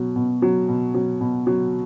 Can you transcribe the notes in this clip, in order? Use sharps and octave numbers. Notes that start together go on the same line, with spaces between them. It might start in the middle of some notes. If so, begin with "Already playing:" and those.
Already playing: B2 F#3
B2
F#3
B2
F#3
B2
F#3